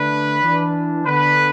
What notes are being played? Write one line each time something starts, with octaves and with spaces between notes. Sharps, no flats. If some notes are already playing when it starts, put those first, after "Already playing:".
Already playing: D3 A3 D4 B4
E3 D4
D3 B3 D4 B4